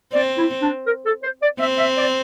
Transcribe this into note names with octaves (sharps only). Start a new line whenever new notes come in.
C4 D5
E4
D4
A#4
A4
C5
D5
C4 E5
E5
D5